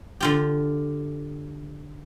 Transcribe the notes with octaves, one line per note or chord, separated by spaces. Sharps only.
D3 F4 G4